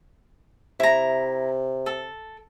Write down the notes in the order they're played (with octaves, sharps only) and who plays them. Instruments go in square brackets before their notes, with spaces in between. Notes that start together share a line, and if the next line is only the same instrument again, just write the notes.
[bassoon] C3 [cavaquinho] E4 A#5
[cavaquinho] A4